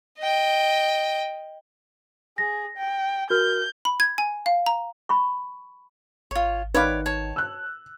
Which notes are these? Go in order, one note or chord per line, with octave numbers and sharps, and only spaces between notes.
D#5 G5
G#4 A#6
G5
F#4 A#4 F6 G6
B5
G#6
G#5
F5
A#5
B5 C#6
G#1 F4 C#5
D#3 B4 C#5 D5 F5 D6
C#5 A5
E6 F#6